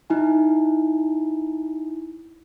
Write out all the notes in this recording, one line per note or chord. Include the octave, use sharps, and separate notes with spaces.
D#4 E4 G#5